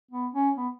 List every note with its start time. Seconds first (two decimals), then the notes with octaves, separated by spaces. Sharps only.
0.11 B3
0.34 C#4
0.57 B3